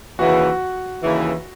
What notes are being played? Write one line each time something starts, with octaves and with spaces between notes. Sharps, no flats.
D#2 C#3 E3 F#4 F#5
D#2 C#3 E3